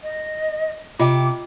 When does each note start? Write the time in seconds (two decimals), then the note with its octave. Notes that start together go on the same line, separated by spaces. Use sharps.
0.03 D#5
0.99 C3 F4 D#5 G5 D6